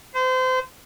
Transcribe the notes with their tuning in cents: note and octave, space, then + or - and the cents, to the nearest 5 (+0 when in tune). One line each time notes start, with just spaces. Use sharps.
C5 -30